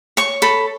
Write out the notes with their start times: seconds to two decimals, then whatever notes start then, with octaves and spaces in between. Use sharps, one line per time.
0.17 C#5 C#6
0.42 A4 B5